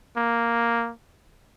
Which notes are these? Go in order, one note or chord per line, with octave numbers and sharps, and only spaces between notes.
A#3